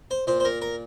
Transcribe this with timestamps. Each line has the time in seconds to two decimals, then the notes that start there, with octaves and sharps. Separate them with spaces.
0.11 C5
0.27 A#2 C5
0.40 C5
0.45 A#4
0.62 A#4